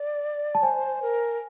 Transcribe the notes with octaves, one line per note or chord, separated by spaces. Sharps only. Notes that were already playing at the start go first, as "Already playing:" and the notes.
Already playing: D5
A5
C5 G#5
A#4